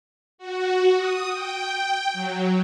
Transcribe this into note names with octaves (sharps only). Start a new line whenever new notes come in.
F#4
D#6
G5
F#3